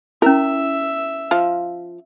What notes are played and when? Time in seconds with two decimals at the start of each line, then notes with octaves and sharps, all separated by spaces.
0.22 C#4 E4 A#4 E5
1.31 F3 F4 F5